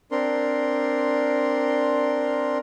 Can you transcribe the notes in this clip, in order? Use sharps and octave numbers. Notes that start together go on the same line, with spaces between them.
C4 D4 A#4 C6